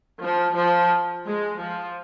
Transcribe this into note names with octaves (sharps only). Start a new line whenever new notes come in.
F3
F3
G#3
F3